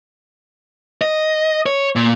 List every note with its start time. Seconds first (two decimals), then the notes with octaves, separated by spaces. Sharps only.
1.01 D#5
1.66 C#5
1.96 A#2